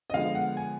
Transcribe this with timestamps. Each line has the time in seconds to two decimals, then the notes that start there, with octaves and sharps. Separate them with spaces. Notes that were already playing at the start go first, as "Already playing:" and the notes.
0.10 D#5
0.13 D3 F3 G#3 B3 F5
0.35 F#5
0.57 G#5